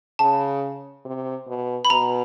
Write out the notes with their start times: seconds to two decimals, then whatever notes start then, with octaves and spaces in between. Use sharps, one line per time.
0.19 C#3 A5
1.05 C3
1.47 B2
1.85 B5
1.90 B2 A#5